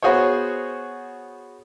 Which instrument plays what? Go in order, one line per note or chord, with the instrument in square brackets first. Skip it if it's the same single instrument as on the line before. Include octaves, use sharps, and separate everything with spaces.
[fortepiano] B3 F#4 G#4 C5 C#5